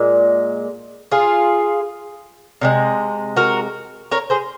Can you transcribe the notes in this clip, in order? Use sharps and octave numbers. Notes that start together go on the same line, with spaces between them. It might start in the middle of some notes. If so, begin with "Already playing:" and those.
Already playing: A#2 G#3
F4 G#4
C3 D#3 G#3
F#4 A#4
A#4 C#5
G#4 C5